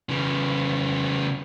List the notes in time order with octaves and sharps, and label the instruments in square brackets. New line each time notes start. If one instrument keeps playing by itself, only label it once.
[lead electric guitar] C#3 E3